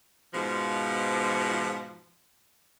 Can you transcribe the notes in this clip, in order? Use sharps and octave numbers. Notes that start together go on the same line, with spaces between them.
G#2 B2 F3